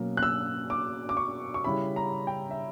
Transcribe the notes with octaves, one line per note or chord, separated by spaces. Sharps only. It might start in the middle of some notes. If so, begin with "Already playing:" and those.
Already playing: B2 F#3 A#3 C#4
F#6
E6
D6
D6
C#6
C#6
C#3 G3 C#4 E4 B5
A#5
G5
E5